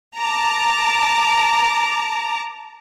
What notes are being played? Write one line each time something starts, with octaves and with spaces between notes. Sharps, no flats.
A5 A#5 D6